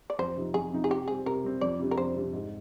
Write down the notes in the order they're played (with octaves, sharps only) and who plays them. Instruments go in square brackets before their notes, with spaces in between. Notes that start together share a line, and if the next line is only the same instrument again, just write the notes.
[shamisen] D5
[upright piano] F2 [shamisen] C5
[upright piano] C3 F3 C4 D#4
[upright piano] F2 [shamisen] G#4
[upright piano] C3 F3 C4 D#4
[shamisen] G#4
[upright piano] C3 [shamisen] G4
[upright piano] G3 C4 [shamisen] G#4
[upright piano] C3 [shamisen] A#4
[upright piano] G3 C4
[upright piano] F2 [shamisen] D5
[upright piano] C3 G3 D4
[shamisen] A#4
[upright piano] F2 [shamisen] C5
[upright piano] C3 G3 D4
G#2